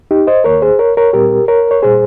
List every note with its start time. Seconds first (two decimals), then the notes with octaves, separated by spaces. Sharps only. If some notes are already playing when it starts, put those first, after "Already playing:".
0.11 D#4 G4
0.27 C5 D#5
0.44 D#2 D#3 A#3 A#4 C#5
0.62 G#4 C5
0.79 A#4 C#5
0.97 A#4 C#5
1.13 A#2 G3 C4 G4 A#4
1.48 A#4 C#5
1.71 C#5
1.82 A#2 G3 G#4 C5